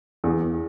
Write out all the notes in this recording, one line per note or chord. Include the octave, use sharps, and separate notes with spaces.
E2